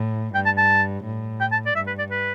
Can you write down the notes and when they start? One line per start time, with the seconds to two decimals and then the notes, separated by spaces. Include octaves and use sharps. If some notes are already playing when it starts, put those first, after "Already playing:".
Already playing: A2
0.34 G2 G5
0.45 A5
0.57 A5
1.04 A2
1.41 G5
1.52 A5
1.66 D5
1.75 G2 E5
1.87 B4
1.98 D5
2.11 B4